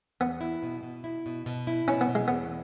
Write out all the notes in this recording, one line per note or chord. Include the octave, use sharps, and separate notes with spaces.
E2 B3
E4
B2
B2
E4
B2
B2
E4
B2 C#4
B3
B2
G#3
E2 B3